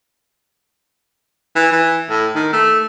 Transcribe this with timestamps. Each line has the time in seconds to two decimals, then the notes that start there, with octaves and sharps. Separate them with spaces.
1.56 E3
1.72 E3
2.10 A2
2.35 D#3
2.53 A3